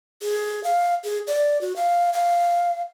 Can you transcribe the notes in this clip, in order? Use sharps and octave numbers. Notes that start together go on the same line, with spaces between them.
G#4
F5
G#4
D5
F#4
F5
F5